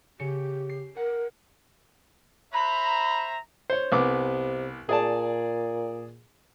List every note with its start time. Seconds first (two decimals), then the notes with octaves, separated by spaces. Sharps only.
0.20 C#3 G4 C#7
0.69 C7
0.97 A#4 F#5
2.53 C5 E5 A#5 B5
3.70 C5 C#5
3.92 C2 C3 B3 D6
4.89 A#2 G#4 D5 A5